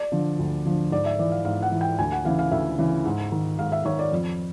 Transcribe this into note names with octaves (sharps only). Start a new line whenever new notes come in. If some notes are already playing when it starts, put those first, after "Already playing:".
Already playing: D5
D3 F3
D2
D3 F3
G#2 D5
E5
E3 D5
F5
G#2 F5
F#5
E3
G5
D2 G#5
F#5
C#3 E3 F5
F5
D2 E5
C#3 E3
G#2
D#3
G#2 F5
E5
D#3 C#5
D5
F2